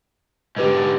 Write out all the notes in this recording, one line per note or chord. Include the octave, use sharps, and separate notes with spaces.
G#2 D3 G4 B4 D#5